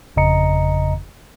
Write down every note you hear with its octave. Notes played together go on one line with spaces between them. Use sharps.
G1 F2 C#3 D#5 A#5 C#7